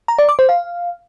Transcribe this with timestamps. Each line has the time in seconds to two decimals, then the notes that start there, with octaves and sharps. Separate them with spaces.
0.08 A#5
0.18 D5
0.29 D6
0.39 C5
0.49 F5